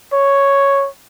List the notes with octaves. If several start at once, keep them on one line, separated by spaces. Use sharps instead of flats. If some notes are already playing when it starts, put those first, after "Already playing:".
C#5